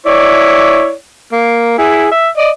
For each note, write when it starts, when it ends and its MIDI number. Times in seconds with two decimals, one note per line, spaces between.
0.06 0.93 64
0.06 0.93 73
0.06 0.93 74
1.33 1.76 58
1.79 2.07 64
1.79 2.07 68
2.11 2.28 76
2.37 2.50 74
2.37 2.50 75